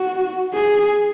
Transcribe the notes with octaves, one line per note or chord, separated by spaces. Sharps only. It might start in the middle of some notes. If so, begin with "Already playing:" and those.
Already playing: F#4
G#4